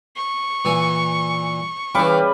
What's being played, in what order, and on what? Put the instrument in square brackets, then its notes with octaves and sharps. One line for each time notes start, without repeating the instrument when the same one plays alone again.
[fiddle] C#6
[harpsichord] A#2 E3 G#5
[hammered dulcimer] C#3 G3 B4 [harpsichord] E3 D6